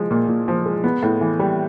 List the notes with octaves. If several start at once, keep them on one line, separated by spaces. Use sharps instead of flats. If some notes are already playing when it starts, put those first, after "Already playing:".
Already playing: F3 G#3
A#2
A#2
F3
G#3
B3
A2
E3
G3